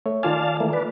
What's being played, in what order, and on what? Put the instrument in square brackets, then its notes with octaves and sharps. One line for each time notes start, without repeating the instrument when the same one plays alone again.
[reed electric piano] A3 C#5 E5
[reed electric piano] D#3 F4 G#5 [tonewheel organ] D5 F5 A5
[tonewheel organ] E3 A3 A#3
B4 D5